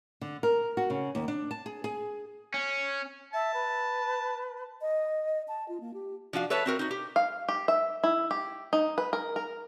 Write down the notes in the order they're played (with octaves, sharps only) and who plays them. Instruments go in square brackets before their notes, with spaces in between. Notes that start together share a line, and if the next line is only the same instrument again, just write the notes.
[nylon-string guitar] D3
A#4
F#4
C#3
D#2
D4
A5
G#4
G#4
[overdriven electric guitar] C#4
[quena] E5 [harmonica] A5
[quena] B4
[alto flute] D#5
A5
F4
A#3
G4
[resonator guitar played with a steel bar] F3 D4 F#4 F5
A4 B4 C#5 E5 A5
C4 F#4 A#4
D#4 F#4
G4
[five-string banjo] F5
G4
E5
E4
G4
D#4
B4
A#4
A#4